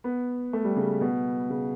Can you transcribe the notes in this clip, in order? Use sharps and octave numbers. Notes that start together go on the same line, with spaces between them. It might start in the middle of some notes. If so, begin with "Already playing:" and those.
B3
A3
G3
C#3
B2
C#3